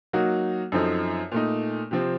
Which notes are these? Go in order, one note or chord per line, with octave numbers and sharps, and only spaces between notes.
F#3 A#3 D#4 F#4
F#2 F3 C4 D#4 A4
A#2 A3 D#4
C3 F3 C4